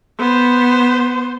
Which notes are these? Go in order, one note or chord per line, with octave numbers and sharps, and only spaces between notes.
B3 C5